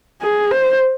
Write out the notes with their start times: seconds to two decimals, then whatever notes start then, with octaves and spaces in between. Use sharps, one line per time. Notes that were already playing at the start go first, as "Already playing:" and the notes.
0.22 G#4
0.51 C5